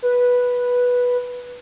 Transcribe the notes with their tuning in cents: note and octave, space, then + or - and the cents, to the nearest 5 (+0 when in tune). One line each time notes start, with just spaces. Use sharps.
B4 -10